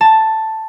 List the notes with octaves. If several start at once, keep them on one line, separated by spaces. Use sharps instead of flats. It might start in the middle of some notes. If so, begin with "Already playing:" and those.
A5